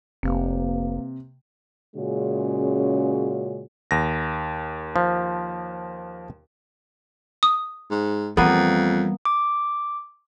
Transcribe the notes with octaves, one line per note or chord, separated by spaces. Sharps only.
F1 C3 A#3 B4 F5
A#2 C#3 G#3 C#4 F#4
D#2 A#6
F3
D#6
G#2
F2 E3 G3 A#3 B3
D6